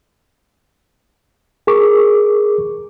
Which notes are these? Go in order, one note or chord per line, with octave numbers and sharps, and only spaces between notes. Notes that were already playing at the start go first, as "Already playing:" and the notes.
G#4 A#4 C#6 D6